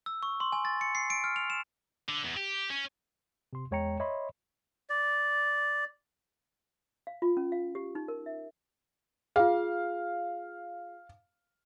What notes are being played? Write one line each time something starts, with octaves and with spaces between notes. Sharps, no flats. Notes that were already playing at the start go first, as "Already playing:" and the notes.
E6
C#6
C6
G#5
A6
C#7
C7
D7
F6
F7
E7
D3
E2
G4
C#4
C3 C6
E2 G#3 C#5 G5 A#5 C#7
C#5 D#5 E5 B5 C6
D5
F5
F4
C#4
F5
G4
D#4
A#4
E5
F4 G#4 F5